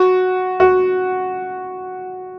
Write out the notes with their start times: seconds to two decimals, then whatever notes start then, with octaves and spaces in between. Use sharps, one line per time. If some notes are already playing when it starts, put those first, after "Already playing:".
Already playing: F#4
0.60 F#4